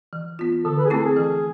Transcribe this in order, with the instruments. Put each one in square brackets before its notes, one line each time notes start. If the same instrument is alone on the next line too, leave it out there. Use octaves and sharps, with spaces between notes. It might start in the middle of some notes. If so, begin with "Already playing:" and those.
[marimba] E3
B3 F4
[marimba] D3 [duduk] A4
[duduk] B4
G#4
[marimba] A3 C4 E4 [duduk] A4
[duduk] G#4
[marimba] E3